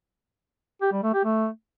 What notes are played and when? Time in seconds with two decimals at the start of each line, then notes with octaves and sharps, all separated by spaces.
0.82 G4
0.92 G3
1.03 A3
1.14 G4
1.24 A3